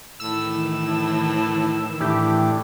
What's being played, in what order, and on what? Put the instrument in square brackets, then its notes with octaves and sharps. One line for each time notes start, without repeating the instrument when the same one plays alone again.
[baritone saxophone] A2 [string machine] D#3 E3 [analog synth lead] E6
[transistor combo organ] A2 E3 D4 [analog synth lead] G4